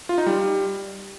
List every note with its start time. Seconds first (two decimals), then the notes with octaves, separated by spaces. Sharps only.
0.09 F4
0.18 D#4
0.26 G3